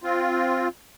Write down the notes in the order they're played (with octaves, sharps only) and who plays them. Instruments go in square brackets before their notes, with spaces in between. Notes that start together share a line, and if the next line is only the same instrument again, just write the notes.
[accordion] C4 F4